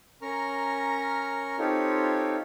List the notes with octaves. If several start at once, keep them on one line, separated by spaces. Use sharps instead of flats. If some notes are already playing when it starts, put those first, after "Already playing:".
C#4 A#4 A#5 C#6 F6
C4 D#4 F4 G4 A4 C#5